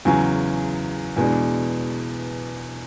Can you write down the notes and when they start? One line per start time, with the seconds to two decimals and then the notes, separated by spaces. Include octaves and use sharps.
0.05 E2 C#3 F#3 C#4
1.16 E2 B2 G#3 D4